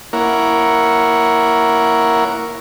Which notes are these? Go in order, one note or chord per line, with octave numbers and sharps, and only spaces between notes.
A#3 E4 A#4 C#5 F#5